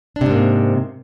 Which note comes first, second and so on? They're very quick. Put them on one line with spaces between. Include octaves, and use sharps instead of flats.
D4 C3 G#2 A#3